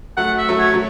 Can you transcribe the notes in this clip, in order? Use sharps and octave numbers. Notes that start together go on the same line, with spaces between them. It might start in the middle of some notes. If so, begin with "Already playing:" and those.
F#3 A3 F#5
E5
F#3 A3
C#5
F#3